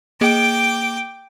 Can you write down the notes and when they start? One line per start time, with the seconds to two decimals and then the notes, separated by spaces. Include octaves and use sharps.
0.21 A#3 G#4 D#5 G5 D6